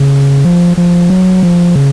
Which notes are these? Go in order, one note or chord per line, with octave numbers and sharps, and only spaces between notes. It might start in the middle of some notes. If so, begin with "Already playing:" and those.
Already playing: C#3
F3
F3
F#3
F3
C#3